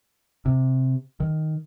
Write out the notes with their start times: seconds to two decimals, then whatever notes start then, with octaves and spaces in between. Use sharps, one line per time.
0.46 C3
1.20 D#3